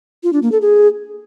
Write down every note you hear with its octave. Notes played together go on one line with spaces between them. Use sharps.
F4
D4
A#3
A4
G#4